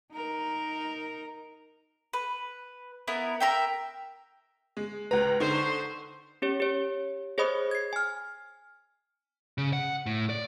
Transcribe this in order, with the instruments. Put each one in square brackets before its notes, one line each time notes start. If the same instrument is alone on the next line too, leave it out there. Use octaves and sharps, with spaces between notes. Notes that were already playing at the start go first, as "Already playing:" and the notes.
[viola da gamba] D#4 A#4
[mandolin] B4
B3 E4 A#4
A#4 E5 G5
[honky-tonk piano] G#3
[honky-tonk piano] C#2 A#5 [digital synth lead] B4
[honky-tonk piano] D3 D#4 [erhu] C5 [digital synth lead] C#6
[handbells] C#4 G4 C#5
G4 C#5
G#4 C5 C#5 D#5 B5 D#6
G#6 C7
G#5 F6
[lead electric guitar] C#3
F#5
A2
D5